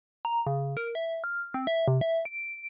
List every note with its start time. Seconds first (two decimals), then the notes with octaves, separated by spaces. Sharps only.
0.25 A#5
0.47 C#3
0.77 A#4
0.95 E5
1.24 F6
1.54 C4
1.67 E5
1.88 C3
2.01 E5
2.25 D7